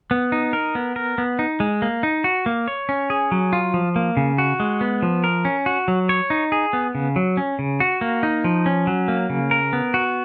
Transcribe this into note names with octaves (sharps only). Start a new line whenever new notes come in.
B3
D#4
A#4
B3
A#4
B3
D#4
G#3
A#3
D#4
F#4
A#3
C#5
C#4
G#4
F#3
F4
F3
A#3
C#3
F#4
G#3
B3
F3
A#4
C#4
F#4
F#3
C#5
D#4
G#4
B3
C#3
F#3
C#4
C#3
F#4
A#3
D#4
F3
C#4
F#3
A#3
C#3
A#4
B3
F#4